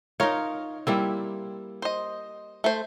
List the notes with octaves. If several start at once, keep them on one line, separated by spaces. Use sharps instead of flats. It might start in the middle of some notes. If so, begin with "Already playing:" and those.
D#4 F4 A#4 C#5
G3 A#3 C4 E4
C5 D#5
A3 C5